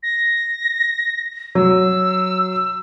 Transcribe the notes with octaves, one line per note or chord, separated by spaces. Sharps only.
A#6
F#3 E6